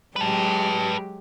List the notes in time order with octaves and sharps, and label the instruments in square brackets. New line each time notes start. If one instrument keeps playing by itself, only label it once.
[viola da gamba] F#3 G#3 G4 [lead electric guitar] B4 A5